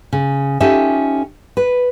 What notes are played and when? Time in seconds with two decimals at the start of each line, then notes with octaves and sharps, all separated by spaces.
0.13 C#3
0.60 C#4 D#4 F4 G4 A4 E5
1.57 B4